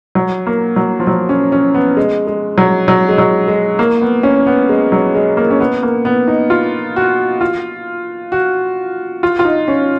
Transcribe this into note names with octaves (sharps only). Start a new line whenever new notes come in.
F#3
A#3
F#3
F3
F#3
C#4
C#4
B3
G#3
G#3
F#3
F#3
G#3
F#3
G#3
A#3
B3
C#4
B3
G#3
F#3
G#3
A#3
C#4
B3
A#3
B3
D#4
F4
F#4
F4
F#4
F4
F4
D#4
C#4